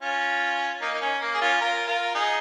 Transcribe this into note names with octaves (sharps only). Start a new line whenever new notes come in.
C#4 F4
A#3 D#4
D#4
C#4
A#3
G#4
C#4 F4
F4 A#4
F4 A#4
D#4 G#4